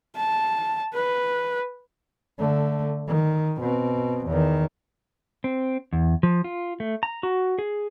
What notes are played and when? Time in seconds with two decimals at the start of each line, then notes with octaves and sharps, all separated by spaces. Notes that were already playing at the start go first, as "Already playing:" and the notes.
0.16 A5
0.94 B4
2.38 D3 A3
3.07 D#3
3.60 B2 C4
4.26 E2 D#3
5.44 C4
5.93 E2
6.23 F3
6.44 F4
6.80 A3
7.03 A#5
7.23 F#4
7.59 G#4